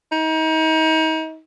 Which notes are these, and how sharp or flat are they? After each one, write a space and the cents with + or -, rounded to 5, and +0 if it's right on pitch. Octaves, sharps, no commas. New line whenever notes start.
D#4 +35